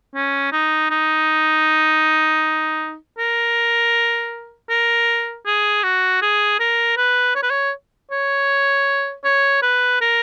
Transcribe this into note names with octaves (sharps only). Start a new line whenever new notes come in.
C#4
D#4
D#4
A#4
A#4
G#4
F#4
G#4
A#4
B4
C#5
B4
C#5
C#5
C#5
B4
A#4